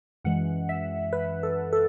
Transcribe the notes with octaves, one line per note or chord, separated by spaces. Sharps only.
F#2 E3 G#3 F#5
E5
B4
A4
A4